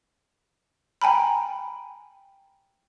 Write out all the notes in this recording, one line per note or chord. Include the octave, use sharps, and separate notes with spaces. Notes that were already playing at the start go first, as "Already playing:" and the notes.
G5 G#5 A#5 B5